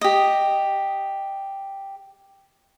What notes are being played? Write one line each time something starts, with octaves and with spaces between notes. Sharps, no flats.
G4 D#5